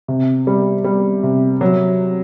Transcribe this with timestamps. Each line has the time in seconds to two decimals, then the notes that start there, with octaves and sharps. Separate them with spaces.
0.08 C3
0.47 G3
0.84 G3
1.23 C3
1.61 F#3